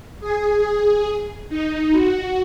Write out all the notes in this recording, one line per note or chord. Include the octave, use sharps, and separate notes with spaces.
G#4
D#4
F#4